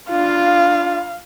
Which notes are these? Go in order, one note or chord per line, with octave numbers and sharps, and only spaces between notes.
D4 F4 F5